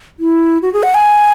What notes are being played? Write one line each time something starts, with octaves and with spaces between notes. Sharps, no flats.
E4
F#4
G#4
F#5
G#5